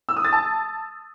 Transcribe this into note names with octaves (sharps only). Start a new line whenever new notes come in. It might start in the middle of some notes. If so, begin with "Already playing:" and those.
E6
D#6
A6
A5